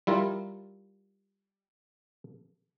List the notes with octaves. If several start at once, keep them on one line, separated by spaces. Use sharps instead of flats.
G3 E4 F4 A#4